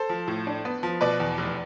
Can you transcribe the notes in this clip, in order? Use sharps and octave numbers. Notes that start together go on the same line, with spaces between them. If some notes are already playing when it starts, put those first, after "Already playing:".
Already playing: A4 C5
F3
A2
D4
B3
F3
B2 B4 D5
E2
F1